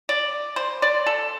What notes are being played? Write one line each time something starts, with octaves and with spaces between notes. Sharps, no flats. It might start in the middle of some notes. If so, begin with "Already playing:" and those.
D5
C5
D5
A4